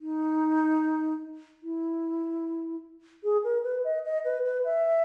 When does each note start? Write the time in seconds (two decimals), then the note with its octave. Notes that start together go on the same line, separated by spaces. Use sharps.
0.01 D#4
1.63 E4
3.24 G#4
3.44 A#4
3.64 B4
3.84 D#5
4.05 D#5
4.25 B4
4.44 B4
4.65 E5